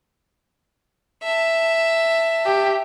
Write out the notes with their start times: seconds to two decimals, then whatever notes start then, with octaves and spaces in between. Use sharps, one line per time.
1.23 E5 A5
2.45 G4